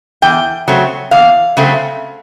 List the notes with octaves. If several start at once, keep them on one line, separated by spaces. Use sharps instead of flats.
E2 G5
C#3 F#3 A3 C4
E2 F5
C#3 F#3 A3 C4